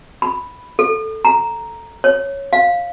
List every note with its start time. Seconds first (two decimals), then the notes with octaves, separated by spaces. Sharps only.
0.22 B5
0.79 A4
1.25 A#5
2.04 C#5
2.53 F5